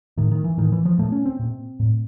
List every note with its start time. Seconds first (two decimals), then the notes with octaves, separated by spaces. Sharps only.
0.17 A2 D#3
0.31 D#3
0.44 E3
0.58 A2 D#3
0.72 E3
0.85 F3
0.98 A#2 A3
1.12 C#4
1.26 C4
1.39 A#2
1.80 A2